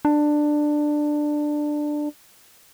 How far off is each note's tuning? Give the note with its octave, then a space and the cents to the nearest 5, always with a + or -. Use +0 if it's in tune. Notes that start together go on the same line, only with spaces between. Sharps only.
D4 +15